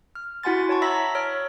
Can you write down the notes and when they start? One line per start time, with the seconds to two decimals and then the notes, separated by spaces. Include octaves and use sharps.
0.15 F6
0.43 E4 F#4 F#5 G#5 C6 A6
0.69 C#5 A5 C#6
0.82 E5 A#5 B5 E6 A#6 B6
1.15 C#5 F6